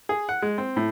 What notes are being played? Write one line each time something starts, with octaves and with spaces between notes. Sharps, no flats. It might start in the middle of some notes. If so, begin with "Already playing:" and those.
G#4
F#5
G#3
C4
A2